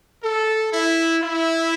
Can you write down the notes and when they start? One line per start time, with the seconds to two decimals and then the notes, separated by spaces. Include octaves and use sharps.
0.23 A4
0.72 E4
1.23 E4